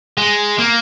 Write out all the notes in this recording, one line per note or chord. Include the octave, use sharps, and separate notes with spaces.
G#3
A#3